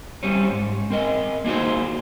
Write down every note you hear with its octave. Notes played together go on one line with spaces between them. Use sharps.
G3 C4 C#4
G#2
C4 A#4 D#5
A#3 D4 D#4 F#4 G#4 C5